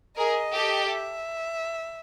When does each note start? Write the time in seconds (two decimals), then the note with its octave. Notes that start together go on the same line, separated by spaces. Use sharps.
0.17 G#4 A#4 D#5
0.53 G4 A4
0.89 E5